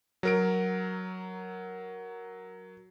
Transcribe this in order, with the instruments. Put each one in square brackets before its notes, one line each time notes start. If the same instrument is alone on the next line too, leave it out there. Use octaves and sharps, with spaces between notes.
[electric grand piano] F#3 A#4 D7